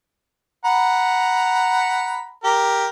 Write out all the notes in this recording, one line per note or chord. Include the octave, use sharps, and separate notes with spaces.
F#5 A#5 B5
G4 A#4